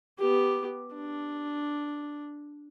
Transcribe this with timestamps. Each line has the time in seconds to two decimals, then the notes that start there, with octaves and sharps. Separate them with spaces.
0.18 B3 G4
0.94 D4